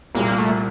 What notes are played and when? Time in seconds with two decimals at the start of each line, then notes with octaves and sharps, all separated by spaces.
0.15 C2 A#2 G3 A#3
0.38 A3